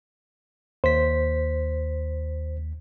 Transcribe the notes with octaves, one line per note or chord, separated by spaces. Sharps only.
D#2 C5 B6